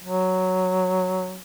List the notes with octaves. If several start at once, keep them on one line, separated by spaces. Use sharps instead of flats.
F#3